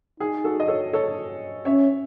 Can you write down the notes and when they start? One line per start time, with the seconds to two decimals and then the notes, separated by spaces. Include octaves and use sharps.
0.20 D#4 G#4
0.44 F#4 A4
0.60 D#5
0.68 A4 C#5
0.93 A4 C#5
1.65 C#4 C#5 E5